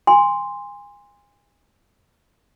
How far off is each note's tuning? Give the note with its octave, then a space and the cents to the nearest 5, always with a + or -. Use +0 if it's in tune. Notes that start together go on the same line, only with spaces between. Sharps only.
G#5 -25 C6 +0